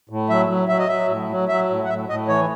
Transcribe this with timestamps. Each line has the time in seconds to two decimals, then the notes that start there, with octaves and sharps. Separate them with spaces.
0.09 A2
0.29 F#3 E5
0.48 F#3
0.68 F#3 E5
0.78 D#5
0.88 F#3 E5
1.09 A2
1.29 F#3
1.48 F#3 E5
1.69 A2
1.84 F#5
1.88 A2 E5
2.09 A2 D#5
2.28 E3 C#5